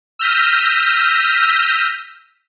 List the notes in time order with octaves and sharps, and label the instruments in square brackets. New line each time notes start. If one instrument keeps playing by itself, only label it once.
[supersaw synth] E6 F6 G6 A#6 B6 D#7